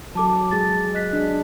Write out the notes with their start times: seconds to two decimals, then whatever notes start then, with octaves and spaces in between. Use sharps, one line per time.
0.15 F#3 A4 A5 D6
0.51 G#3 G#4 A6
0.94 D#5 F#6 B6
1.13 D4 G#4